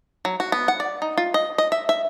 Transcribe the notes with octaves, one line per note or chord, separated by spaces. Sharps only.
F#3
F#4
B3
F#5
D5
D#4
F4
D#5
D#5
E5
E5